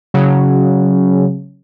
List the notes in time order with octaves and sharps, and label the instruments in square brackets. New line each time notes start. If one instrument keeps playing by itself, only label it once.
[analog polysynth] C#3 F#3